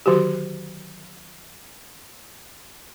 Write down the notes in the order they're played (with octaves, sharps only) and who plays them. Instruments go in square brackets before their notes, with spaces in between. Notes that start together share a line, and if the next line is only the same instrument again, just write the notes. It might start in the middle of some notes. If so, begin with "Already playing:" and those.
[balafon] D3 D#3 F#3 F#4 G4